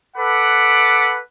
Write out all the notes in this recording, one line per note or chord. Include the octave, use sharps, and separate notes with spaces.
A4 B4 F#5 B5 D6